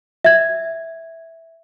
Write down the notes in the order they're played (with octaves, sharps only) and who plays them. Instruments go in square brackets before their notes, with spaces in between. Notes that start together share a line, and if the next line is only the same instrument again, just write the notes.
[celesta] E5 G#6